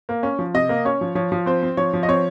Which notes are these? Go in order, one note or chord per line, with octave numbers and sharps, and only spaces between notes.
A#3
C#4
F3
C3 D#5
A#3
C#4 C#5
F3
F3 C#5
F3
C4 C5
C4
F3 C#5
F3
D#5
C4 C#5